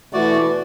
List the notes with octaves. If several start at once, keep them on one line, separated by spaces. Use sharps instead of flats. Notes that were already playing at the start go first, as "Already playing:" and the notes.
B2 E3 A3 F#4 D5